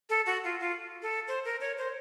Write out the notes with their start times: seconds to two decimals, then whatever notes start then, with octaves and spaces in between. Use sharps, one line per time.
0.09 A4
0.26 F#4
0.44 F4
0.60 F4
1.02 A4
1.28 C5
1.45 A#4
1.61 C#5
1.78 C5